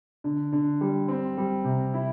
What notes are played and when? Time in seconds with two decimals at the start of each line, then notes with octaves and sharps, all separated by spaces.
0.24 D3
0.52 D3
0.81 G3
1.08 C4
1.37 G3
1.64 C3
1.94 E4